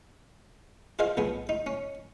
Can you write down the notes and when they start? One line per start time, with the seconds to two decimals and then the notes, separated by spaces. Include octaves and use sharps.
0.99 F4 G#4 C5 D#5 F5
1.17 B1 B3 G#4
1.49 D#4
1.67 C#4